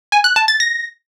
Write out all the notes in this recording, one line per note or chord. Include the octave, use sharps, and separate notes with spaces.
G#5
F#6
A5
A6
A#6